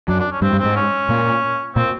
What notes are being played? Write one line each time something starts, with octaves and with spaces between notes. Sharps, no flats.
F#2 F#3 D4
D4
C#4
G2 G3 C4
G2 G3
C4
G#2 G#3
C#4
A#2 A#3
A#2 A#3 C4